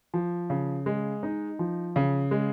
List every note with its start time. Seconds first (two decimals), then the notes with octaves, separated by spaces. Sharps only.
0.14 F3
0.50 C#3
0.86 G#3
1.23 D#4
1.59 F3
1.96 C#3
2.31 G#3